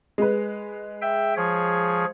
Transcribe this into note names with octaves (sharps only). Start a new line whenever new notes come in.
G#3 B4
E5 G5
F3 G#4 C#5